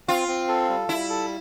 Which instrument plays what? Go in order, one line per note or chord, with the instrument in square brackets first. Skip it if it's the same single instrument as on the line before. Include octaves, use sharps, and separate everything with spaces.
[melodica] C4 [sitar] F4
[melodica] C4
A4
G3
[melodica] G3 [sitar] E4
[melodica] A4